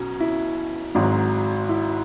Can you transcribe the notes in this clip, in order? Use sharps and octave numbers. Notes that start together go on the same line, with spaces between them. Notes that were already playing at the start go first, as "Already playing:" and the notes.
Already playing: B1 B2 F#3 C#4
E4
G#1 G#2 F#3
E4